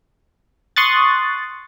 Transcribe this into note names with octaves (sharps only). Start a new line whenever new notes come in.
C6 C#6 D#6 F#6 A6